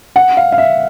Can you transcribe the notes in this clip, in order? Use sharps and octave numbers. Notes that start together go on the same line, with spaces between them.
F#5
F5
F5
E5